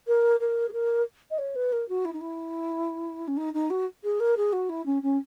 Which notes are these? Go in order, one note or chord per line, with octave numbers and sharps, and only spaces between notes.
A#4
A#4
G#4
A#4
D#5
C#5
B4
A#4
F#4
E4
D#4
E4
C#4
D#4
D#4
F#4
G#4
A#4
G#4
F#4
E4
C#4
C#4